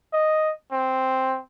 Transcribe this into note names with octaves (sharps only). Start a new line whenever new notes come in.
D#5
C4